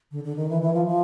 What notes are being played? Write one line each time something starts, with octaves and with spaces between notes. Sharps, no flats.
D3
D3
D#3
E3
E3
F3
F3